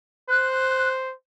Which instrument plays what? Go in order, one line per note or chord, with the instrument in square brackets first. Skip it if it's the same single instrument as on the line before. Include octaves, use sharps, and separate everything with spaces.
[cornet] C5 [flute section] F#6